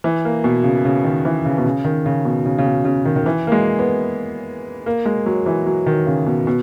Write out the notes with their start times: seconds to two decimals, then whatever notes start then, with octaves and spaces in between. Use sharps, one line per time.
0.04 E3
0.25 A#3
0.44 B2
0.64 C#3
0.85 C#3
1.04 D#3
1.25 E3
1.45 C#3
1.58 B2
1.65 C#3
1.84 D#3
2.06 C#3
2.25 B2
2.46 C#3
2.58 C#3
2.65 B2
2.85 C#3
3.05 D#3
3.16 D#3
3.26 E3
3.47 A#3
3.52 G#3
3.79 B3
4.86 A#3
5.05 G#3
5.26 F#3
5.46 E3
5.66 F#3
5.86 D#3
6.07 C#3
6.26 B2
6.47 B2